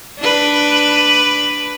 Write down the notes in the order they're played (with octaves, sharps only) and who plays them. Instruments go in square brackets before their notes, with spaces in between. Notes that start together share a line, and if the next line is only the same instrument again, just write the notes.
[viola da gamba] D4 B4